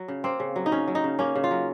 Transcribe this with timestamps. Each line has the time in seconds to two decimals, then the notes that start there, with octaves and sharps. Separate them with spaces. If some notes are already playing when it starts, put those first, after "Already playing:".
Already playing: F#3
0.08 C#3
0.24 A#3 C4
0.40 C#3
0.56 F#3
0.66 D#4
0.71 C#3 C#4
0.87 F#3
0.95 D#4
1.04 C#3
1.19 A#3 C#4
1.35 C#3
1.44 F4
1.51 F#3